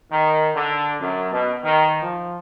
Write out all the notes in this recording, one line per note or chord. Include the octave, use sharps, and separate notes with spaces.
D#3
D3
F#2
B2
D#3
F3